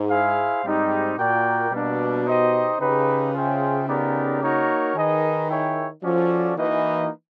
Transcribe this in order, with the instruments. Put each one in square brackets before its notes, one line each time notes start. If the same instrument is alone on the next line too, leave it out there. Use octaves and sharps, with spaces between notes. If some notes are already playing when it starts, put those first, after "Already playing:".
Already playing: [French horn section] G#2
[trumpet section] E4 G#4 C5 F5
[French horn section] G#2 [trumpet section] G3 C4 D#4 G4
[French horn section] A#2 [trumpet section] F#4 A#4 D5 G5
[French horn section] B2 [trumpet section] G3 A#3 D4
[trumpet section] D#4 G4 C5 D#5
[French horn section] C#3 [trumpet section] D#4 G4 B4
[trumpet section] F4 G#4 C5 E5 G5
B3 D#4 G4 A#4 D5
A#3 D#4 F#4 A#4 C#5
[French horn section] D#3 [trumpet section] D#4 G#4 B4 D#5
[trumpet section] E4 G#4 C#5 E5 G5
[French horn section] F3 [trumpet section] C#4 F#4 A4 D5
[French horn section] E3 [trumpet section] A#3 D#4 F#4 B4 D#5